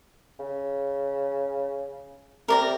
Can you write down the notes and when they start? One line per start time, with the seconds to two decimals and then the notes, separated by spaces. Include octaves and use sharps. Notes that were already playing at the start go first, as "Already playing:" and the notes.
0.39 C#3
2.48 C3 A#4 D5 A#5